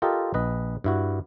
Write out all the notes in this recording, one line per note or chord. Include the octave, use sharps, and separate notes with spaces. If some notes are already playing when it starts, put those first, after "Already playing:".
F4 G4 A4 A#4 D#5
A#1 B4 D#5
G2 E4 F#4